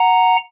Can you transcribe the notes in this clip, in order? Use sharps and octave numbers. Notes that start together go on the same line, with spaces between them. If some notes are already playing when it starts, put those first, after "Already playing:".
Already playing: F#5 A#5